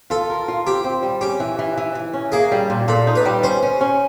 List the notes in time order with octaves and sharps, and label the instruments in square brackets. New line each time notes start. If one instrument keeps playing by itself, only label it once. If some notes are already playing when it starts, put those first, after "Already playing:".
[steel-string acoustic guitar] F4 [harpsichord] A4
[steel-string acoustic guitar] A#4
F4
[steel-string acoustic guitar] C4 [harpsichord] G4
[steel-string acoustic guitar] C4
G3
[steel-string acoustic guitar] C#4 [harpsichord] G4
[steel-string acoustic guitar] E3
E3
E3
E3
C#4
[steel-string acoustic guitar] A#3 [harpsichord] G#4
[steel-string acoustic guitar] G3
A#2
[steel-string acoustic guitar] A#2 [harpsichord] A4
[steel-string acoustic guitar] D#4
[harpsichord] B4
[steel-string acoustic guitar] G3
[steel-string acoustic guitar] C#4 [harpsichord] C5
[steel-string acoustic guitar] C#4
C#4